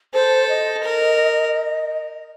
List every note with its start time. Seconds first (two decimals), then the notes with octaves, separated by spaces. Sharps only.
0.14 A4 C5
0.49 D#5
0.83 A#4